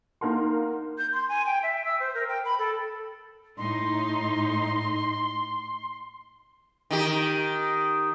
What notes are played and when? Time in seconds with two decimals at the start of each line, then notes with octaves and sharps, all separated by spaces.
0.21 A#3 D#4 A#4 F#5 C6
0.98 G6
1.13 C6
1.29 G#5
1.46 G5
1.63 E5
1.85 E6
2.00 C5
2.14 A#4
2.29 G5
2.45 B5
2.59 A4
3.58 A2 D#4 C6
6.91 D#3 G4